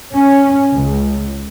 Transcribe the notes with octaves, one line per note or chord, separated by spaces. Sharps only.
C#4
C#2